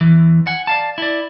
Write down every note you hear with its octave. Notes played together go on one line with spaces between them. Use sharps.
E2 E3
F#5 G#5
D5 F5 A5
E4 D5